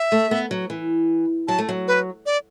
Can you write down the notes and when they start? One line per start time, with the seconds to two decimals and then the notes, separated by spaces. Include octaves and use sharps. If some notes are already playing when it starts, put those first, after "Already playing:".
Already playing: E5
0.12 A3
0.31 B3
0.51 F#3
0.70 E3
1.48 F#3 A5
1.58 A3
1.69 F#3
1.88 B4
2.26 D5